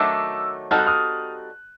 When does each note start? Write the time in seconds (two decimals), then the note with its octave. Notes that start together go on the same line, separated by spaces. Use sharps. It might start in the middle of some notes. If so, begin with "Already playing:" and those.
Already playing: D#3 F#3 A3 D4 D6 E6
0.71 G3 C4 D#4 F#4 A4 F6
0.78 F#6
0.87 D#6 F6